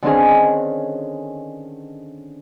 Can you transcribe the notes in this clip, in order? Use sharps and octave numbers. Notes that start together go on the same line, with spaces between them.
D3 D#3 C4 C#4 G#4